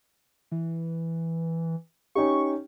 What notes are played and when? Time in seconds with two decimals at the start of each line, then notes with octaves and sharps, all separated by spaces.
0.52 E3
2.15 C#4 D#4 G4 C#6